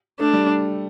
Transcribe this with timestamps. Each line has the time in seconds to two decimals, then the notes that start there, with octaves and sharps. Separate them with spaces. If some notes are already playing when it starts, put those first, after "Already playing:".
0.19 A3 D4
0.33 G3